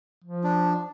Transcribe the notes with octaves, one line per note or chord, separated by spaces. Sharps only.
F3
D4